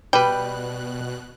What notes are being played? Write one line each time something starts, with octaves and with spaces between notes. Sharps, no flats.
B2 G3 B4 G5 F#6